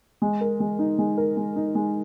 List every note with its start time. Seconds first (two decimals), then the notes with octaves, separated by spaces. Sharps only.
0.22 G#3
0.41 A#4
0.60 G#3
0.79 D#4
0.99 G#3
1.17 A#4
1.37 G#3
1.56 D#4
1.75 G#3